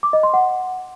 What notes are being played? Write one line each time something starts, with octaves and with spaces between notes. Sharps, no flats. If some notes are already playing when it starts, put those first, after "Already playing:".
D6
D#5
C6
F#5